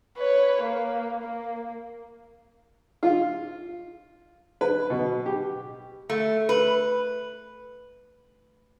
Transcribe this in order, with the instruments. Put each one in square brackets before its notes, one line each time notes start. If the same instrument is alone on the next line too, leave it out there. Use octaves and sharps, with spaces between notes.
[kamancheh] B4 C#5
A#3
A#3
[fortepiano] F4
B4
B2
G4
[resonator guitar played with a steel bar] A3
B4